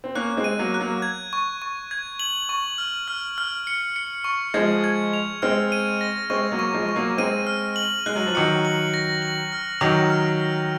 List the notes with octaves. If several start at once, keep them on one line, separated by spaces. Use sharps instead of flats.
C4
A#3 C#4 F#6
G#3 C4
D#7
F#3 A#3
F#6
F#3 A#3
G#6
C#6
C#6
G#6
F#7
C#6
F6
F6
F6
C#7
C#7
C#6
F3 G#3 G#6
G#6
F7
G#3 C4 F6
D#7
A#6
G#3 C4 C#6
F#3 A#3
C#6
F3 G#3
C#6
F#3 A#3
G#3 C4 D#7
F6
F#7
G#3 F#6
F#3
F3
D#3 F#3 C#7
F#7
A#6
F#7
F6
D#3 F#3 F7
F6
F6